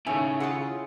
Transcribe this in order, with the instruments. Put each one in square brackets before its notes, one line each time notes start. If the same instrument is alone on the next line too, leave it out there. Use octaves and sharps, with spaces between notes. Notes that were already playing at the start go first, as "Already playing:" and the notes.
[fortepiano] D#2 A2 [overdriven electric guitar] C#3 [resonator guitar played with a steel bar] A3 [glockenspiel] G#5
[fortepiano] E4 G#4 [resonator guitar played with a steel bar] F4 F#5